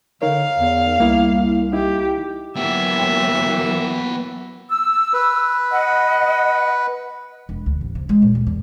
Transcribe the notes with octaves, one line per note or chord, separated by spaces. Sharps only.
D3 D#4 A#4 C#5 F5
E2
C2 A#3 E4
D#4 E4 G4
E3 F#3 A#3 B3 G4 E5
E6
B4
D#5 F#5
E1
D2
A1
C3
G#3
A#2
D#2
E2